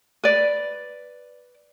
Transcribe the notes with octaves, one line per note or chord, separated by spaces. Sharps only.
B4 D5